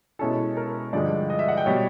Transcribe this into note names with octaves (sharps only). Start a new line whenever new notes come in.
B2 G#3 C#4 E4 A4
A#4
G2 D3 F3 G#3 D5
D#5
E5
F#5
G5
B2 G3 C#5